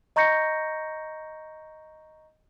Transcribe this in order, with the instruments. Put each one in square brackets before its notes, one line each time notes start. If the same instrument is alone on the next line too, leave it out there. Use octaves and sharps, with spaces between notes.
[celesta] D#5 A#5 C#6 G6 A#6 C#7